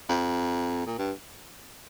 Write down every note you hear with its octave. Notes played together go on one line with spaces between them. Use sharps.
F2
A#2
G2